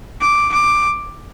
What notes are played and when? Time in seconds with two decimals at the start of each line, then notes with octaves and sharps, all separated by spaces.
0.21 D6
0.53 D6